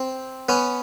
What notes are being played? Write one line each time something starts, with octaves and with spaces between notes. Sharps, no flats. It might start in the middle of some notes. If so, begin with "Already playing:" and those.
Already playing: C4
B3 C#4